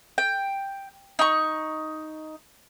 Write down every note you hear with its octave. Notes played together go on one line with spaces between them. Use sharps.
G5
D#4 C#6